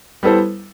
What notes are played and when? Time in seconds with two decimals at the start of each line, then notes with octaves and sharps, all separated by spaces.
0.23 G3 B3 E4 A4 C5